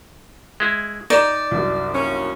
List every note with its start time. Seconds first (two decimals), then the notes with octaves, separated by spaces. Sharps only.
0.60 G#3 E4
1.10 D#4 D5 A#5 E7
1.51 C2 F#2
1.94 D#3 A#3 C#4